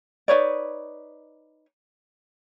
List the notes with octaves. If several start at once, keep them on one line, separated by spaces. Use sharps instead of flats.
D#4 B4 C#5 D5